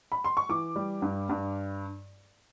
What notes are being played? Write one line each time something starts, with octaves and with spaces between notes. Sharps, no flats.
B5
C6
C#6
E3 D6
G3
G2
G2